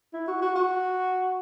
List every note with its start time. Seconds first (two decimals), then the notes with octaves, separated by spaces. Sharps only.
0.14 E4
0.28 F#4
0.42 F#4
0.55 F#4